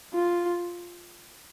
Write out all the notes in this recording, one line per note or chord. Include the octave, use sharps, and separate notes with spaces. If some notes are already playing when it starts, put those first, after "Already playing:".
F4